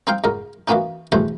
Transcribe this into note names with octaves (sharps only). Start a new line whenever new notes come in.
C4 D#4 C5 F5 G5
C#2 G#2 A#4
E3 F#3 A#3 B3 C#4 D#4
A1 E2 B2 A3 E4 C5